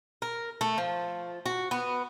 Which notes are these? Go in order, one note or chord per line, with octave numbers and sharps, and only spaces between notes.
A#4
A3
F3
F#4
B3